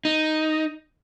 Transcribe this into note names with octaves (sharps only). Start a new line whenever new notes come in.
D#4